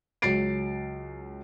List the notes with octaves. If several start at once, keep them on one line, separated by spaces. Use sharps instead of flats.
C#2 F#3 A6 C7 D7